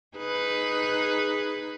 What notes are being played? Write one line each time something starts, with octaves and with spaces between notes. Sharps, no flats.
D#4 G#4 B4